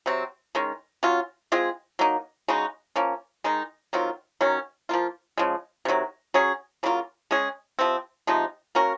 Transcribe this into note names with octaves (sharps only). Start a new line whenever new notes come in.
C3 F#3 C4
D#3 G#3 C#4
F#3 C#4 F4
G#3 C4 F4 G#4
F#3 A#3 D#4
C#3 G#3 D#4 F#4
F3 A#3 C#4
D#3 G#3 D#4
D#3 F#3 C4 F4
D#3 F#3 C#4
F3 A#3 F4
C#3 F3 G#3
C3 D#3 F#3
F#3 C#4 G#4
C#3 F#3 A#3 F4
G#3 C#4 G#4
C3 F3 C4
C3 F3 G#3 D#4
A#3 C#4 F#4 A#4